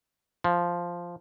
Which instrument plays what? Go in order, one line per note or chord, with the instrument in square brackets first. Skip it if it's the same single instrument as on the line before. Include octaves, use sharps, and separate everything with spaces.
[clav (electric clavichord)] F3